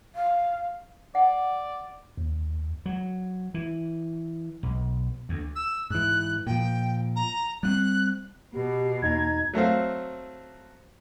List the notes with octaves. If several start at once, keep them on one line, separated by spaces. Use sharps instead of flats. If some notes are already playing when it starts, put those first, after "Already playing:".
F5
D5 F#5
D#2
F#3
E3
B1
D2
E6
G#2 E3 F#6
A#2 F3 G5
A#5
G3 B3 C4 F#6
B2 G4
E2 A#3 D#4 A#5 G#6
F#3 A3 C4 F5